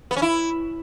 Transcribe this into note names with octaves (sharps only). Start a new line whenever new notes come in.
B3
C#4
E4